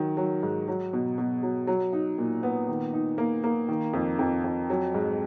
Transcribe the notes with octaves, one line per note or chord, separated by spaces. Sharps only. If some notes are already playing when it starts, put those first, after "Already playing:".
Already playing: D#3 F#3
F#3
G#2
F#3
B2
B2
F#3
F#3
D#4
A#2
B3
D#3
D#4
A#3
A#3
D#3
F2
F2
F2
F#3
G#2